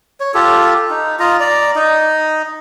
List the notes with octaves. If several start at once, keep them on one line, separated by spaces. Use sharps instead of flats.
C#5
F4 G4 A4
D#4
F4 D#5 A#5
D5 A#5
D#4 D#5